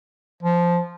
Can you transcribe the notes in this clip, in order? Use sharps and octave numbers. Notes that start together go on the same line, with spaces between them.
F3